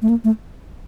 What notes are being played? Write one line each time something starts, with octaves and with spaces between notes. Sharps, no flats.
A3
A#3
A3